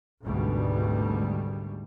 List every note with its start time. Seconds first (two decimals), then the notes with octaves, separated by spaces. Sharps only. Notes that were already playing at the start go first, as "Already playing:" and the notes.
0.22 G#1 D2 G#2 B2 G3